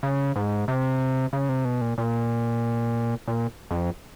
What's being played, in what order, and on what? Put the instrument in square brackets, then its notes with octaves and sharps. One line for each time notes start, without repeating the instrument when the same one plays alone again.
[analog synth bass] C#3
G#2
C3
C#3
C3
B2
A#2
A#2
A#2
F2